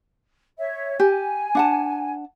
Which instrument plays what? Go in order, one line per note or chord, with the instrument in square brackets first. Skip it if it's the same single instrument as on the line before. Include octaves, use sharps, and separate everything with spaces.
[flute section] C#5 E5
[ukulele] G4 [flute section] G#5
[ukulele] D4 F#5 A5